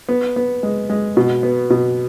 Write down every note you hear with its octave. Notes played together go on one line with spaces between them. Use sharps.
B3
B3
G#3
G#3
B2
B3
B2